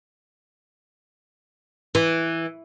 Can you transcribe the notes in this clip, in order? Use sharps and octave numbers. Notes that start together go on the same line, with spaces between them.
E3